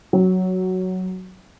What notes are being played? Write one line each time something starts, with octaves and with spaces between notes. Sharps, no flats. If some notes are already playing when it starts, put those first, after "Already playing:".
F#3